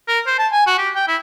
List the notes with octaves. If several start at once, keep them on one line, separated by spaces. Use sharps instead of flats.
A#4
C5
A5
G#5
F#4
G4
G5
E4